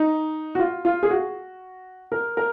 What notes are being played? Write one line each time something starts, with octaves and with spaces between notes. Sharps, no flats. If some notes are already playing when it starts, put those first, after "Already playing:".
Already playing: D#4
F#4
F4
F4
G#4
F#4
A#4
A#4